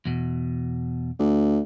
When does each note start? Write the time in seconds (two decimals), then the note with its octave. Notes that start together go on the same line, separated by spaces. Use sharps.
0.05 E2 B2
1.19 D2